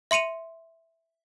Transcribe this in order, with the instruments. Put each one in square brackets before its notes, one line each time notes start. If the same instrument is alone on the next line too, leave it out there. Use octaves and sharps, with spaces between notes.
[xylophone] E5 C6 C#7 D#7 F7